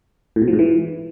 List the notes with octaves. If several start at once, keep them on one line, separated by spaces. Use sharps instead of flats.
A2
B2
F3
G#2
E3